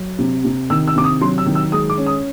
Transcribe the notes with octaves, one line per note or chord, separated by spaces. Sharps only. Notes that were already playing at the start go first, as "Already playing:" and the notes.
Already playing: F#3
C3
C3
D#3 E6
E6
C3 D6
D#6
F#3 C6
E6
D#3
E6
G#3 D#6
D6
C#4
D#6